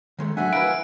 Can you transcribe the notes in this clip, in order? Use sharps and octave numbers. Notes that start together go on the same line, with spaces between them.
D#3 G#3 A3
F#3 A3 D4 E5 F#5 G#5
E4 A#4 B4 F5 D7